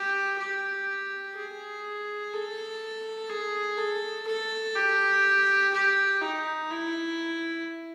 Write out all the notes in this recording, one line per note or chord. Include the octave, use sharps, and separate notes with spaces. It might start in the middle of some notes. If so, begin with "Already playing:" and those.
Already playing: G4
G4
G#4
A4
G#4
A4
A4
G4
G4
D#4
E4